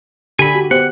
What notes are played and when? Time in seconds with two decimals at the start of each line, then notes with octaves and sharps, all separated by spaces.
0.39 D3 G4 A4 G#5 B5
0.55 F#4 G4
0.71 B3 G4 C5 F#5